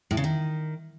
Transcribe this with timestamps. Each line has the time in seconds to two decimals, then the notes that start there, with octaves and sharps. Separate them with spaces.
0.11 A2
0.17 C#3
0.24 D#3